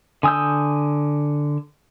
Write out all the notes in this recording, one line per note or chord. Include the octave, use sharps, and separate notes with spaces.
D3 G#5 D#6 E6 G6